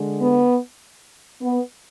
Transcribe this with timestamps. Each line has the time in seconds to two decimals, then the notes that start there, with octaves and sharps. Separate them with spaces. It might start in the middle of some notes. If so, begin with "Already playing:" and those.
Already playing: D3 G#3
0.20 B3
1.41 B3